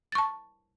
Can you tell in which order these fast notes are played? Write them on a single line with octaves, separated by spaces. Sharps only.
A6 C#6 A5